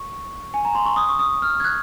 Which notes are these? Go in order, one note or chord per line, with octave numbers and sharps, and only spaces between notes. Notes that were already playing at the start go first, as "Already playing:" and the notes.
Already playing: C#6
G#5
A#5
C6
C#6
D#6
C#6
D#6
F6
G#6
F#6